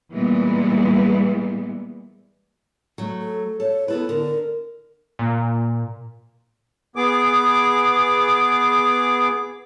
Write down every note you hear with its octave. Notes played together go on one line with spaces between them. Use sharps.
A#2 E3 G3 G#3 B3
F#3 A3
A4
A4 C#5
B3 E4 A4 B4
D3 A#4
A#2
B3 G#4 D6